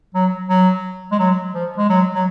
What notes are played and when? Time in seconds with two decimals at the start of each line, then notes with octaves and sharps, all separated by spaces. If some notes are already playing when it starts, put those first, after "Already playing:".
0.15 F#3
0.49 F#3
1.11 G#3
1.19 F#3
1.54 F3
1.78 G#3
1.89 F#3
2.15 F#3